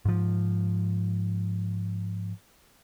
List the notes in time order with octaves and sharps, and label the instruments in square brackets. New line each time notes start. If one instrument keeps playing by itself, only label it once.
[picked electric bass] G#2 F3